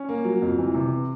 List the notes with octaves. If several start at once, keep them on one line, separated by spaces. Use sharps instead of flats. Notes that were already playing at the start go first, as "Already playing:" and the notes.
Already playing: C#4
A#3
F#3
F2
E3
C3